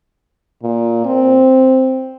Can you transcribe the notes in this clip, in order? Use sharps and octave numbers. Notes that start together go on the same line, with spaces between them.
A#2
C4